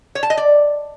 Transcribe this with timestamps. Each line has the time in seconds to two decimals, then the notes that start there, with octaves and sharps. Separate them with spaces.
0.15 C#5
0.23 A5
0.30 D#5
0.37 D5